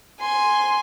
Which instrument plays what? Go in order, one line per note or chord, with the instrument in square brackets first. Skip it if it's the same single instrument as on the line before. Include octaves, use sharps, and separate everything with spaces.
[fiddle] G#5 C6